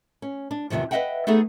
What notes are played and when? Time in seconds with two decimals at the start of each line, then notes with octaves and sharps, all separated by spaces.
0.22 C#4
0.51 D4
0.70 E2 G2 C3 D#3 F3
0.91 B4 C5 D#5 E5 F#5 G5
1.27 A3 B3 D#4 G#4 A4